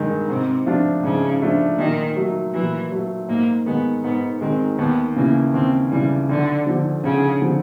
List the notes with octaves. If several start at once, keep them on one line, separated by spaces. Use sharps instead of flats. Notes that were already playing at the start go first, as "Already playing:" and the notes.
Already playing: G2 D#3 G#3
G#2 C3
F3 A3 D4 F4
G#2 C#3
F3 A3 D4 F4
A#2 D#3
F#3 A3
A#2 E3
F#3 A3
G#2 A#3
D#3 G#3 B3
G#2 B3
D#3 G#3 C4
D#2 B3
C#3 E3 A#3
D#2 C4
C#3 E3 G3
D2 D3
D3 F3
D2 C#3
D3 F3